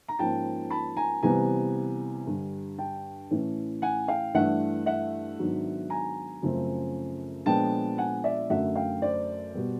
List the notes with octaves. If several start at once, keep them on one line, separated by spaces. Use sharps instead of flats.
A#5
G#2 F3 A#3 C#4 G5 A5
A5 B5
G#5 A#5
C3 E3 G3 B3 G#5 A#5
G2 D3 G3
G5 A5
A2 E3 A3 C#4
F#5 G#5
F5 G5
G2 E3 A3 D4 E5 F#5
E5 F#5
G#2 D#3 F#3 B3 D4
G#5 A#5
F#2 C#3 F3 A3 C4
A#2 F3 G#3 B3 D4 G5 A5
F#5 G#5
D5 E5
F#2 D3 F#3 A3 E5 F#5
F5 G5
C5 D5
B2 G3 B3